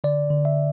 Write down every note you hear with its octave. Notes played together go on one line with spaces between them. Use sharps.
D3 D5
D3
E5